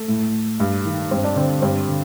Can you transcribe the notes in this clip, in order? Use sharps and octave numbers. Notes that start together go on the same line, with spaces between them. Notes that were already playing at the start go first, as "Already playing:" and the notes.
Already playing: A3 A4
A2
G2
D#3
G2 C4 C5
D4 D5
D3 C4 C5
G2 C4 C5
D3